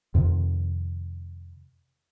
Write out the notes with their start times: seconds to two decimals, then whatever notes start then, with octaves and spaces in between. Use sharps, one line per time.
0.15 F2 C3 D#3